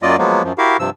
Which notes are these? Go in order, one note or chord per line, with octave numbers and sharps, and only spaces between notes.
F#2 F#3 A#3 F4 D5 D#5
F3 F#3 G#3 A#3 B3
F#2 F3
E4 F#4 G4 A#4 F5
G2 C3 F3 E6